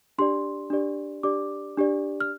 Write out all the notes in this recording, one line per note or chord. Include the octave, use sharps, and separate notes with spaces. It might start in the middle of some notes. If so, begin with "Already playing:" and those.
D4 G4 D5 C6
D4 G4 D5
D4 G4 D5 D6
D4 G4 D5
F6